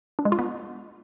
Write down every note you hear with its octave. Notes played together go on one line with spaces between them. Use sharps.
D4
G#3
F4
B3